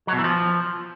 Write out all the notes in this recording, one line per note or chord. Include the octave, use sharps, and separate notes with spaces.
F#3
B2
E3
F3